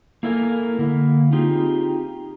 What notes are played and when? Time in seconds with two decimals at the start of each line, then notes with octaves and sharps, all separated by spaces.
0.23 A#3 E4 A4 A#4 D#5 G#5
0.79 D3 A#3 E4
1.32 C4 D#4 F4 G4 G#4